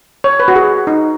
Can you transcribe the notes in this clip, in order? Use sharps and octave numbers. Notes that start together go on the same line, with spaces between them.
C#5
B4
F#4
G#4
D#4